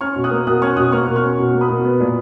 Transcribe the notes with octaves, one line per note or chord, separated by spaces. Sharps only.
C#4 C#6 F6
B2
D#6 F#6
A#3
B2 D#6 F#6
C#4 C#6 F6
B2 D#6 F#6
A#3 C#6 F6
B2
C#6 F6
C#4
B2
A#3
B5 D#6
B2
B3
A#2